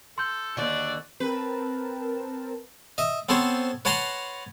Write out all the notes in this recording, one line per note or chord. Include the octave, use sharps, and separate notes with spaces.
A4 C6 G6
D#2 D3 F#4 D5
C4 A#4 B4 A5
D#5 E5
B3 C4 A4 C5 C#5
B4 C#5 F#5 A5 A#5 C6